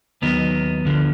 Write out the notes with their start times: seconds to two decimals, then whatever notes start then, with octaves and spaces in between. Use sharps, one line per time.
0.22 D#2 D#3 F#3 B3
0.85 D2 D3 F3